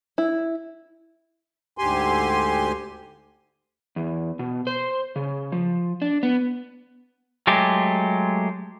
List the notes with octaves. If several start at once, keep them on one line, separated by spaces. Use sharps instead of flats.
E4
D2 G#2 D3 G4 G#5 C6
E2
B2
C5
C#3
F3
D4
B3
F#3 G#3 A3 G4